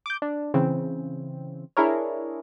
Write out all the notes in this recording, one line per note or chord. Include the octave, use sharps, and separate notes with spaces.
D6 G6
D4
C#3 E3 C4
D4 E4 G#4 A#4 C#5